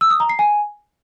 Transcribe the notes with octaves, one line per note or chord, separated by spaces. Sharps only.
E6
D#6
A#5
C7
G#5